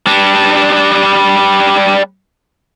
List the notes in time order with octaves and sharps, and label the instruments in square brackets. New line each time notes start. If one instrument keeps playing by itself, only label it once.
[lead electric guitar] G3 D4